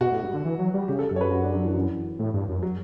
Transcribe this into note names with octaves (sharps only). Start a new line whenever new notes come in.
B2 F#4
A2
G2
D3
E3
F#3
G3
C#3 G4
A4
F#2 A4
C#5
B4
F#4
D4
F#3
E3
F#3
E3
A2
G2
F#2
F#3